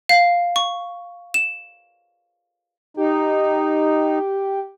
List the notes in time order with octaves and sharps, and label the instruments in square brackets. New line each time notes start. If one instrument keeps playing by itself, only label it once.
[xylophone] F5
C#6
E7
[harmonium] D#4 [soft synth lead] G4